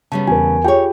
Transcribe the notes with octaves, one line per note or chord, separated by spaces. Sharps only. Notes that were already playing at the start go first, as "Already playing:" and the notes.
C#3 G3 B3 A5
E2 A#4 G#5
D#4 F4 G4 G#4 C#5 G5